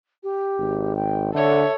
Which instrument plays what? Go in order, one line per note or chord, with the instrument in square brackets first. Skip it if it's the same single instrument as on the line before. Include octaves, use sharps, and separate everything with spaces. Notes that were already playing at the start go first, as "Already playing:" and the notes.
[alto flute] G4
[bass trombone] G#1
[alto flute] G5
[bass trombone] D3 [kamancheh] A4 C#5 [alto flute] E5